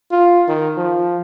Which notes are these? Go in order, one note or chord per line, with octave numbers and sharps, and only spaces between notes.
F4
D#3
F3